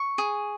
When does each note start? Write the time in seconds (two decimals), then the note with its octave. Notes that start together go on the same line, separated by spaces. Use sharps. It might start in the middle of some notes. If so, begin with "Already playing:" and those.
Already playing: C#6
0.18 G#4